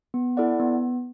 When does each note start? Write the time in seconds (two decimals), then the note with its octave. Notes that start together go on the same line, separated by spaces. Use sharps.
0.14 B3
0.37 E4 A4 D5 F#5
0.60 B3